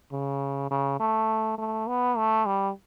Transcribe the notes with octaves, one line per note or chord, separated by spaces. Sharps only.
C#3
C#3
A3
A3
B3
A3
G3